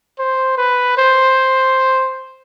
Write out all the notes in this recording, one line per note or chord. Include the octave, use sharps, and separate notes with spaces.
C5
B4
C5